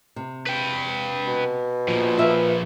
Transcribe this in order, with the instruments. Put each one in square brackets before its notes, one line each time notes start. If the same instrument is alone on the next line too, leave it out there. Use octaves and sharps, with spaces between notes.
[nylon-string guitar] C3
[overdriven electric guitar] B4 G5
[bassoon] B2
[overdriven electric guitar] A#2 F3
[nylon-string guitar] F4 B4 E5